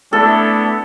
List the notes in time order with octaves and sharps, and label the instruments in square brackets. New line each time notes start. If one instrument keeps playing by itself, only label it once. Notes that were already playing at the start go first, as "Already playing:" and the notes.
[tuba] A3 [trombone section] B3 D4 E4 [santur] A4